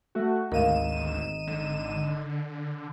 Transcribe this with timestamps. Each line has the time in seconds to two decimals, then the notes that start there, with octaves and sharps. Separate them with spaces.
0.15 A3 F#4
0.52 G#1 D2 D#4 A#4 F5 D#7 E7
1.47 D3